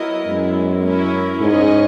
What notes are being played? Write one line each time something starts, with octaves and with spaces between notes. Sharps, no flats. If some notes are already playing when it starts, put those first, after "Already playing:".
Already playing: F#3 B3 E4 A#4 D#5
F#2 G#3 B3 E4
C#4 E4 A#4
G#2 C#4 G#4 D#5